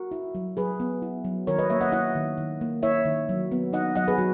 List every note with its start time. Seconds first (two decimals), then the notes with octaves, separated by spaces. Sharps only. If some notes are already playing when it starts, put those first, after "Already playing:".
Already playing: F#4 A#4
0.11 E4
0.35 F#3
0.57 F#3 G#4 B4
0.80 B3
1.02 E4
1.25 F#3
1.47 D#3 A#4 C#5
1.59 B4 D#5
1.70 A#3 C#5 E5
1.81 D#5 F#5
1.92 E4 D#5 F#5
2.15 D#3
2.37 D#3
2.61 A#3
2.83 E4 C#5 E5
3.05 D#3
3.29 F#3
3.52 B3
3.73 D#4 D#5 F#5
3.96 F#3 D#5 F#5
4.08 G#4 B4
4.18 F#3 F#4